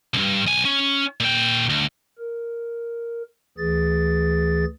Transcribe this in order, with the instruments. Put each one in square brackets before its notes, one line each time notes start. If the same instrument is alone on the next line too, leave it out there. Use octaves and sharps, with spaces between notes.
[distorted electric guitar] C2 G2
B1 G#5
C#4
A#2 G5
D2
[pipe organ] A#4
D2 E3 G#4 A6